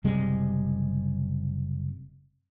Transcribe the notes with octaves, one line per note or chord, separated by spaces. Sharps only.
F#1 C3 G3 G#3